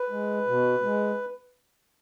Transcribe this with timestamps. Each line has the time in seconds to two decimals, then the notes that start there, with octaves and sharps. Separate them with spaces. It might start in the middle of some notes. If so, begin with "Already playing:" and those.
Already playing: B4
0.10 G#3
0.47 B2
0.83 G#3